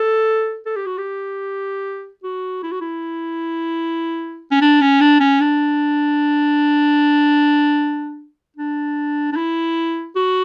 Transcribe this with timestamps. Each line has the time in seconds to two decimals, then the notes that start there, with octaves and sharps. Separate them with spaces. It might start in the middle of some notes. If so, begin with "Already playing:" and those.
Already playing: A4
0.66 A4
0.76 G4
0.86 F#4
0.98 G4
2.24 F#4
2.63 E4
2.72 F#4
2.81 E4
4.51 C#4
4.61 D4
4.81 C#4
5.01 D4
5.20 C#4
5.41 D4
8.57 D4
9.32 D4
9.36 E4
10.16 F#4